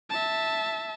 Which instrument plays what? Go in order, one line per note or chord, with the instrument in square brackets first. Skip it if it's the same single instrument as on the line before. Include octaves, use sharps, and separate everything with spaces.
[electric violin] E5 A5